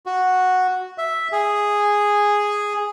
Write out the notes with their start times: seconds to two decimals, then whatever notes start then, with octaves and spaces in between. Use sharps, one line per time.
0.06 F#4
0.98 E5
1.32 G#4